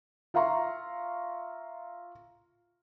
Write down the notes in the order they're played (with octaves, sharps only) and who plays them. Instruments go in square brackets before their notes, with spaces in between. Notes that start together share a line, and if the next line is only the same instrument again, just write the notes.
[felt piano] F4 E5 F5 A#5 C6 C#6